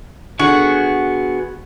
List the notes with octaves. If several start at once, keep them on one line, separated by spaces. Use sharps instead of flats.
D3 B3 F#4 G#4 F#5